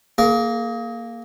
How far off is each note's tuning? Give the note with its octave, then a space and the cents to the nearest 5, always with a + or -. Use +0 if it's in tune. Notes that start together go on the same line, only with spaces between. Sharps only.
A#3 +0 G#4 +30